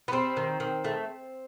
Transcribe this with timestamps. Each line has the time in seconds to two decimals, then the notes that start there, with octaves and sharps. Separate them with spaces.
0.08 B3
0.12 G3 C4
0.37 D#3
0.60 D#3
0.84 A3